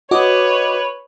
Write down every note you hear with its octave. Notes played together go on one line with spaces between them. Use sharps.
F#4 B4 C#5 D#5 D6